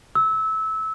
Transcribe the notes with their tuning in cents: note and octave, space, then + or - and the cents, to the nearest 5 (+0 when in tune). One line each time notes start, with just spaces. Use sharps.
E6 -20